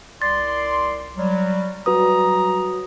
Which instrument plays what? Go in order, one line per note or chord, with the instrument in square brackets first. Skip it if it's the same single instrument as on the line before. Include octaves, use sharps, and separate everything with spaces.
[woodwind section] C2 D5 C6 [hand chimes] A6
[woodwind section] F#3 G3
[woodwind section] F#3 G3 A#5 [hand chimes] F#4 B4 D#6